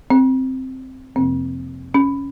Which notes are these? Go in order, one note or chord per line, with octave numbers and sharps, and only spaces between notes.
C4
F2 C3 F3 A#3 C4
C#4